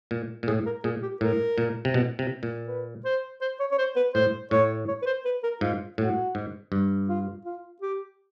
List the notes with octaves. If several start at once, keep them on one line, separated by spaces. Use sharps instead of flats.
A#2
A#2
A2 G#4
A#4
A#2 G#4
G4
A2 A#4
A#2
C3
B2
C3
A#2
B4
C5
C5
C#5
C#5
C5
B4
A2 C5
A2 C#5
C#5
B4
C5
B4
A#4
G#2 F4
A2 F#4
G#2
G2
F4
F4
G4